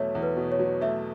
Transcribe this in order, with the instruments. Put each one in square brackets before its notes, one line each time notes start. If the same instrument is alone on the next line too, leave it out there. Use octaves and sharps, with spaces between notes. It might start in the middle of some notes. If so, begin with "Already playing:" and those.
Already playing: [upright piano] E2 B2 F#3 A3 [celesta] C#5
[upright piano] E2
[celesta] B4
[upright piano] B2
[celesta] C#5
[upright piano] F#3
[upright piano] A3 [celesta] E5